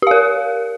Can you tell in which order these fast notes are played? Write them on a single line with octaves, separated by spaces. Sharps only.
G4 F5 A#4